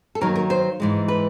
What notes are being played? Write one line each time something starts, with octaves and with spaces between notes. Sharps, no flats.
A4
D#3 F#3 A#3 D#4 A#4
A#4
C5
G#2 E3 G#3
B4